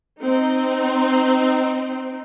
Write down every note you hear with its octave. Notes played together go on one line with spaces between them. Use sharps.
C4 D#4